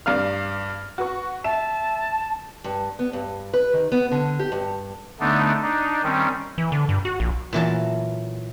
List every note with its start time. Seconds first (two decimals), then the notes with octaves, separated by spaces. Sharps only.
0.06 G2 D5 F5 F6
0.98 F#4 B4 C#6
1.44 E5 A5 E7
2.64 G2
2.99 B3
3.13 G2
3.53 B4
3.73 D#3
3.92 B3
4.11 D3
4.39 G4
4.52 G2
5.20 D3 A3 B3 D4 D#4
5.62 D4 D#4
6.04 D#3 G3 C4 C#4
6.58 E3
6.72 D3
6.89 G2
7.05 F#4
7.20 A#1
7.53 A#2 E3 F#3 A5